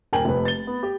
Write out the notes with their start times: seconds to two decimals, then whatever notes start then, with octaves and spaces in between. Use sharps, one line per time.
0.13 D#1 A#4 G5 G#5 F#7
0.25 F1 B4
0.45 A6 G7
0.67 B3
0.83 G4